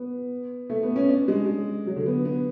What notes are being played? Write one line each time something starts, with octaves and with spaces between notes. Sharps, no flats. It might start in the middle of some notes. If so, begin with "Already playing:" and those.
Already playing: B3
A3
B3
C#4
D4
G#3
F#3
D3
B3
B3